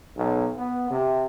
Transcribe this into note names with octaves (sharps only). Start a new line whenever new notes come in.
B1
B3
C3